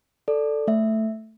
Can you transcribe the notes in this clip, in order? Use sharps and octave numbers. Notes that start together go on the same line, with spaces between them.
A4 D5
A3 E5